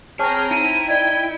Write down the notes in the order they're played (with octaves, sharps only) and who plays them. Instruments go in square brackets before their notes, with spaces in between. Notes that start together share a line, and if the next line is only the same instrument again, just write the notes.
[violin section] C4 G5 A#5 [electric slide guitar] G#4 [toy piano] C#5 A5 C#6 [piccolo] F6
[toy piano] D#4 [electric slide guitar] E4 [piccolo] D#7
[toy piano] D5 D#5 [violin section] G5 [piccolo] G#6